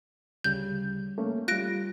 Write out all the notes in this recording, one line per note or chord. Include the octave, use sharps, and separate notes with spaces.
D2 C#3 G3 G6
A3 A#3 C#4
G3 F4 F#6 A#6 D7